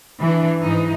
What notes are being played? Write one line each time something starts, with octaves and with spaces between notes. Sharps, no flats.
E3 D4
G#2 E3 D#4